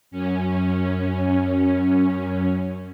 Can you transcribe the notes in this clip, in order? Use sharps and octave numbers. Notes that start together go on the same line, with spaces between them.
F#2 C#4